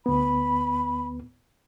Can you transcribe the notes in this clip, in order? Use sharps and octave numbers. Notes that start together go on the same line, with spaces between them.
D2 B3 B5